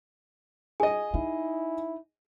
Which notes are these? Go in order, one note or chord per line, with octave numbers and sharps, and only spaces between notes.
G#4 D#5 G#5
D#4 E4